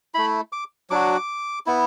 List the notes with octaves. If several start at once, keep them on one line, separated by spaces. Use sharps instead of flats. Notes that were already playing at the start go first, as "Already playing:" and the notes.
A3 E4 B5
D6
F#3 D4 F#4 D6
B3 E4